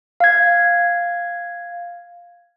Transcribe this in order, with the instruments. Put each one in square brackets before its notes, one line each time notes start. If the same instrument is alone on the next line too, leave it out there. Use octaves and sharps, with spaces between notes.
[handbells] F5 G#6